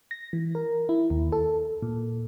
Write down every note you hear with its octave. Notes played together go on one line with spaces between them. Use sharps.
A#6
E3
A#4
E4
D#2
A4
A#2